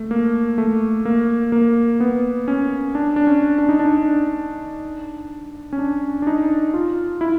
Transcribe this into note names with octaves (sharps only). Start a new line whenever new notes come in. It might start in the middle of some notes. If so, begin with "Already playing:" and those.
Already playing: A3
A#3
A3
A#3
A#3
B3
C#4
D4
D4
C#4
D4
D#4
D4
C#4
D4
D4
D#4
F4
E4